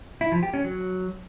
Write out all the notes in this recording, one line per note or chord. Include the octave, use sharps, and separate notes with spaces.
E4
F3
G4
C#4
F#3